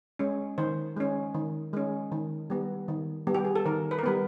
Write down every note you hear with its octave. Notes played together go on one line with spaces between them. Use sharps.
G#3 C#4
D#3 C5
G#3 C#4
D#3
G#3 C#4
D#3
G3 B3
D#3
G3 B3
G4
G#4
A4
D#3 A#4
B4
A#4
G3 B3 B4